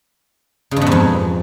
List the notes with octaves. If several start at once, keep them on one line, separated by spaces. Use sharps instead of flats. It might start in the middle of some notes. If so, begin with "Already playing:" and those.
C#3
G2
B2
G#2
F2